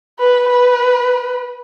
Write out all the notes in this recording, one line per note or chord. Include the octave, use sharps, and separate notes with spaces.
B4
B4